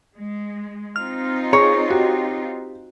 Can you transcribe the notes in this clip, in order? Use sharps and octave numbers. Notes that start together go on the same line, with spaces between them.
G#3
C4 D#4 F4 F6
G#4 C#5 C#6
F#4 G4